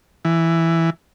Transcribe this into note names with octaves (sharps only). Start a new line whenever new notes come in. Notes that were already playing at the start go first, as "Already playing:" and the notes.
E3